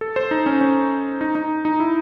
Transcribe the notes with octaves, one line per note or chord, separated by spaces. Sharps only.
A4
C5
D#4
C#4
C#4
D#4
D#4
D#4
E4